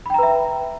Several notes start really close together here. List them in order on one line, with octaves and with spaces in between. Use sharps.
B5 G5 A#5 B4 E5